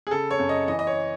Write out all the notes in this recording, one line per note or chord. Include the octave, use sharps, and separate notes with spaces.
G#4
C#3 A4
C#5
F#2
D#5
E3 D#5
D#5
C#5